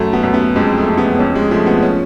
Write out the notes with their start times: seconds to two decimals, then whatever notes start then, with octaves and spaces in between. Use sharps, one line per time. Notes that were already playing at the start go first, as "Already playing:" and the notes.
Already playing: F#2 A3
0.13 B3
0.23 F#2
0.34 B3
0.56 F2 G#3
0.77 A3
0.88 F2
0.98 B3
1.19 F2 C#4
1.35 G#3
1.51 F3 A3
1.66 B3
1.82 C#4